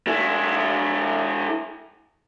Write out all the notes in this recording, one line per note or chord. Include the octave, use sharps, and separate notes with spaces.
G#3 E4